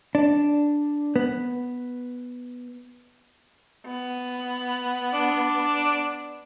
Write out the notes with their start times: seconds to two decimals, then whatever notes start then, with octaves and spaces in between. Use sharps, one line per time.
0.15 D4
1.16 B3
3.87 B3
5.14 D4